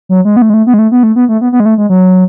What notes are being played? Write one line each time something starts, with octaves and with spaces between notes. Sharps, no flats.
F#3
G#3
B3
A3
G#3
A3
B3
G#3
A3
B3
A3
B3
A3
B3
B3
G#3
A3
G#3
F#3